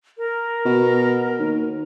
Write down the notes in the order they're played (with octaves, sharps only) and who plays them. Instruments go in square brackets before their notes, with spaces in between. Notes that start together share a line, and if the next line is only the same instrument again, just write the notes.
[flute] A#4
[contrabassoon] B2
D#2